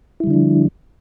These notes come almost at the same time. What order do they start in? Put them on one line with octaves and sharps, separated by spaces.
E4 G3 D3 D4 F3